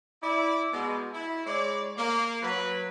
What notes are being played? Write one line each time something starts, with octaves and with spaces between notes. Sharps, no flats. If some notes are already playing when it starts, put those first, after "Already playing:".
E4 D5
B2 G#3
E4
G#3 C#5 D5
A#3
F#3 B4